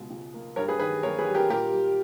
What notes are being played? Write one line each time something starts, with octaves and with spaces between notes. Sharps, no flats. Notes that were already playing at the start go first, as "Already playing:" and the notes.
Already playing: C#2 B2 G#3
C#2
A#3
G2 A#4 C#5
G#4 B4
D#3 G#4 B4
A#3 A#4 C#5
G#4 B4
G3
G4 A#4
A#2 G4 A#4
G3